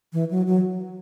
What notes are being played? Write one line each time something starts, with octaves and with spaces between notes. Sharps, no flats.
E3
F#3
F#3